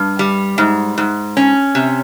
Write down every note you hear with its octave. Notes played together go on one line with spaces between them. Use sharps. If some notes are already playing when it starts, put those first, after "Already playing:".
Already playing: G2
G3
G#2
G#2
C#4
C3